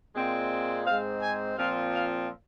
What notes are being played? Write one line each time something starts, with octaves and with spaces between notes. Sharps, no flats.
A#2 G#3 C4
G#2 G#3 C4 F5
G#5
A#2 F3 C4 F5
F5